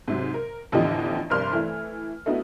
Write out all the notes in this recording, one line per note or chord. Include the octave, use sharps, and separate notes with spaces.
G#2 C3 F#3
A#4
A1 E2 D3 F3 G4 D#5
F1 G2 A#4 D5 C6 F6
E3 A3
A3 B3 D#4 E4 F#4